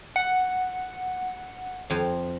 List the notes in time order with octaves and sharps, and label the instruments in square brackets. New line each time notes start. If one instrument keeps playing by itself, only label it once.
[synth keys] F#5
[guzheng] F2 F5